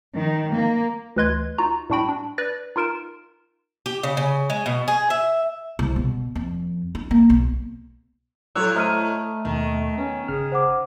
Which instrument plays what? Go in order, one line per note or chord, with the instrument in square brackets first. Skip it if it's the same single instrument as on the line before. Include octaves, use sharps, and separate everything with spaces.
[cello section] D#3
A#3
[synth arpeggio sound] D2 E3 B4 D#5 C6 G#6
D#4 F4 F#4 A#5
A2 G3 D4 F#4 G5 B5
D4
B4 D5 F#6 A#6
D#4 F4 A#4 D7 E7
[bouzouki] G4
C#3
C#3
G#3
B2
G#4
E5
[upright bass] C2
B2
F2
D4
A#3
B1
[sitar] A2 C#5 [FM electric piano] F#3 E6 [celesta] A4 F#6
[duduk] A3 [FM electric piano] C5 D#5 E5 [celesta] A#5 F6 D#7
[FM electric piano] D#2 B2 [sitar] D#3
[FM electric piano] B3 [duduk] C#4
[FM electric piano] G#1 C#3 F6 [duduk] G#4
[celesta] C5 F#5 D6